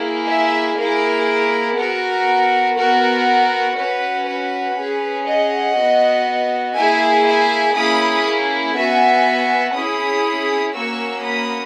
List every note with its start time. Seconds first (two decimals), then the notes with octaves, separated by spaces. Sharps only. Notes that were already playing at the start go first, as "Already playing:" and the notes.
Already playing: A#3 E4 G#4
0.28 E5 G#5
0.78 A#3 E4 G#4 A#4
1.77 B3 F#4 A#4
2.77 B3 F#4 A#4
3.77 C#4 F#4 B4
4.27 B4
4.76 C#4 G#4
5.26 D#5 F#5
5.76 B3 F#4
6.76 A#3 E4 G#4 E5 G#5
7.25 E5 G#5
7.75 A#3 C#4 E4 G#4 B5 D#6
8.75 B3 F#4 E5 G#5
9.75 C#4 E4 G#4 B5 D#6
10.74 A#3 C#4 F#4 C#6 E6
11.24 B5 D#6